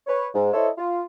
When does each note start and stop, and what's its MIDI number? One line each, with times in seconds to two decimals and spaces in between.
0.07 0.26 71
0.07 0.26 73
0.34 0.50 44
0.53 0.68 64
0.53 0.68 69
0.53 0.68 72
0.53 0.68 73
0.53 0.68 75
0.53 0.68 76
0.77 1.02 65